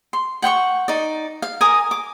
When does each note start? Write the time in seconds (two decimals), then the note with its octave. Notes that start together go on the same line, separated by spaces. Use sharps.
0.13 C6
0.42 F#5 G5 C6 C#6
0.88 D#4 D5
1.42 F5
1.61 A#4 G#5 D6 D#6
1.91 D6